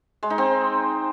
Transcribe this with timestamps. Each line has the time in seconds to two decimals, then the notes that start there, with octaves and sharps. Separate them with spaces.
0.23 G#3
0.30 D#4
0.38 C4